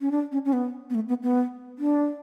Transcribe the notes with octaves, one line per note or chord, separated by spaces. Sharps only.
C#4
D4
C#4
C#4
B3
B3
A3
B3
B3
D4